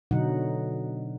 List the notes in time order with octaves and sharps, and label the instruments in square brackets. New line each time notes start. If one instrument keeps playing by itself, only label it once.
[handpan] B2 D3 F#3 D#4 F#5